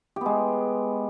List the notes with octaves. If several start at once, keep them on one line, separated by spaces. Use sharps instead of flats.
G#3 B3 G4